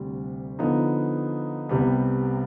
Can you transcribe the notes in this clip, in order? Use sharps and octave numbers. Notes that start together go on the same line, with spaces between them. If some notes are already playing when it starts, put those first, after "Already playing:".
Already playing: D2 C3 G3
D3 F3 B3 D#4
C2 C3 G3 B3